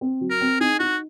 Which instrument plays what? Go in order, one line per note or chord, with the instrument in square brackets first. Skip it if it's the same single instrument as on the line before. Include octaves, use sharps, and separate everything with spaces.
[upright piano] C4
F#3
[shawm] A#4
[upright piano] C4
[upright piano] D#4 [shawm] G#4
[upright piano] D#4 [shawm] F#4